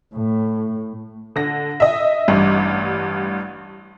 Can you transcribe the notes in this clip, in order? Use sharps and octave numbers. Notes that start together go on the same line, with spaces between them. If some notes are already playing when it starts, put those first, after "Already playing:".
A2
D3 A#6
D#5 E5
A1 G2